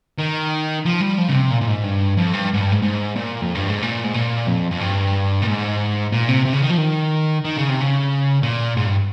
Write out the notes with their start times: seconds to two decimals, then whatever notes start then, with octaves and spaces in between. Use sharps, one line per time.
0.19 D#3
0.85 F3
1.01 G3
1.18 F3
1.28 C#3
1.34 C3
1.51 A#2
1.61 A#2
1.67 G#2
1.83 G2
2.17 F2
2.33 G2
2.54 G#2
2.60 G2
2.72 G#2
2.83 G#2
3.16 A#2
3.42 F2
3.55 G2
3.68 G#2
3.82 A#2
4.04 G#2
4.15 A#2
4.47 F2
4.71 F2
4.80 G2
5.42 A#2
5.47 G#2
6.12 A#2
6.29 C3
6.45 C3
6.53 C#3
6.63 D#3
6.70 F3
6.78 D#3
7.44 D#3
7.57 C#3
7.69 C3
7.81 C#3
8.43 A#2
8.77 G#2
8.86 G2